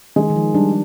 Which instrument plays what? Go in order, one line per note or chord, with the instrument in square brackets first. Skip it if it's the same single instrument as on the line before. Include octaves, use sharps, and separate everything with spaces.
[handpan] D#3 [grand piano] G#3
[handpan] D#3
F3
[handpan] G3 [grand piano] D4